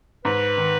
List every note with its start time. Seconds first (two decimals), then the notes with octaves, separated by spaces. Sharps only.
0.25 G#2 B4
0.57 D#3